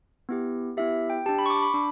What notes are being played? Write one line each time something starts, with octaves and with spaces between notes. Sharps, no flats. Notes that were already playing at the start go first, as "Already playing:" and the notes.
B3 E4 G4
B3 E4 G4 E5
G5
D4 G4 A5
B5
C#6
D6
B5
D4